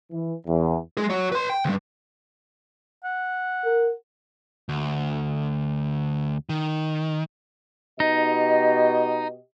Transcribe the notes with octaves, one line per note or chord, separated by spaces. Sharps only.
E3
E2
G#3 G#4
F#4 C#5
B4 C6
G5
D2 G2
F#5
A#4
D2
D#3
B2 D#4 G4 D#5